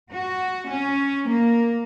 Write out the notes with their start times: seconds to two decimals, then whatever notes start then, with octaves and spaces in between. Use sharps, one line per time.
0.13 F#4
0.69 C#4
1.29 A#3